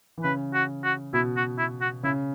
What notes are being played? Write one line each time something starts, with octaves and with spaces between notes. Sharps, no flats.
E3
C#3 B4
F#4
F#4
B2 E4
F#4
E4
F#4
C#3 E4